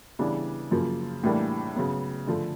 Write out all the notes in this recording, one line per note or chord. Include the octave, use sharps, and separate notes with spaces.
C#3 E3 G3 B3 D4
F#2 C#3 F3 A#3
A2 E3 G3 A#3 D4
C#3 F#3 B3
D3 F3 A3